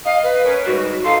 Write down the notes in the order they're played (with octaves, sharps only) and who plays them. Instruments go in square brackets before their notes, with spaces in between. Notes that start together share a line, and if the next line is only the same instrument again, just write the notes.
[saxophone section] D#5 [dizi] F5
[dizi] B4
[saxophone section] C#4 A#4
[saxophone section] G#2 G3 [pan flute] F#4
[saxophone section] D#4 F4 A4 [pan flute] F5 [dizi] C6